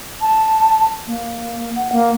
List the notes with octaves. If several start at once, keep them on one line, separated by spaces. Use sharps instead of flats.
A5
A#3
F#5
A#3